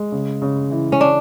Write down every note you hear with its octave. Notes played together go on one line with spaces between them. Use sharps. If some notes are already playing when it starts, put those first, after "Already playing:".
Already playing: G#3
C#3
C#3
E3
C#4
D4